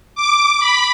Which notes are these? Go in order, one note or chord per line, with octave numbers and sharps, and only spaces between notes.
D6
B5